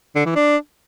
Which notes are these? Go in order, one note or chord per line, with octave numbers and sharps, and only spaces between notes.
D3
E3
D4